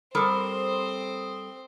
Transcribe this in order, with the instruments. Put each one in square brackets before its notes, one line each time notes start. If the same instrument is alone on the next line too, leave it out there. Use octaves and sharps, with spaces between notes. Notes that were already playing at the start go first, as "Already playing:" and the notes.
[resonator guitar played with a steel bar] G3 A4 A#4 [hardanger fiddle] C4 C5 [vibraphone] D#6